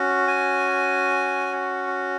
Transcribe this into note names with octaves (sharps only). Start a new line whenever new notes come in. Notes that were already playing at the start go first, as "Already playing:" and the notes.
Already playing: C#4 F#4
G#5